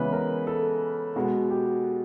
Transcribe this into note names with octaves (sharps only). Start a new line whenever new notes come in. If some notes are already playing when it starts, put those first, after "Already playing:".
Already playing: C#3 E3 G#3 B3 B4
A#4
A4
B2 G#3 B3 F#4
G4